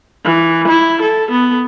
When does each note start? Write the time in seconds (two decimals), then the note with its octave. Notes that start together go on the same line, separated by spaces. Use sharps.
0.25 E3
0.68 E4
1.02 A4
1.31 B3